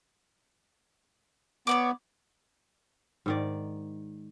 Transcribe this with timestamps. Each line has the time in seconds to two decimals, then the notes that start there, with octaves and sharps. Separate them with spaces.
1.67 B3 C#5 D5 D6
3.26 G#2 D#3 D5